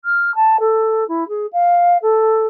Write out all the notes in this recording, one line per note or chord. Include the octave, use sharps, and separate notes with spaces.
F6
A5
A4
E4
G#4
F5
A4